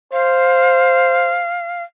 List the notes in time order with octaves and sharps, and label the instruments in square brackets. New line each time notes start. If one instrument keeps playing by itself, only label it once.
[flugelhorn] C5 [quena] F5